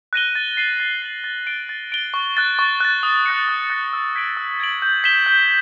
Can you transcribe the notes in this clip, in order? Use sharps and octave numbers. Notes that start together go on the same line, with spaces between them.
F#6 A#6 D#7 G7
A6
C7 D#7 F#7
A6
C7 D#7 F#7
A6
D7 G7
A6
D7 G7
C#6
F#6 A6
C#6
F#6 A6
D#6
F#6 A#6 C#7
D#6
F#6 A#6 C#7
E6
G#6 B6 D7 F#7
E6
G#6 B6 D7 F#7
G6
B6 E7 G7
G6